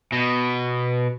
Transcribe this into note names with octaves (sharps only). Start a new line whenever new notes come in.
B2